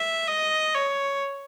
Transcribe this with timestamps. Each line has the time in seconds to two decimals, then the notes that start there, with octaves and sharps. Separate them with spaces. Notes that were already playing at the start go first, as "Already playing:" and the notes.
Already playing: E5
0.27 D#5
0.74 C#5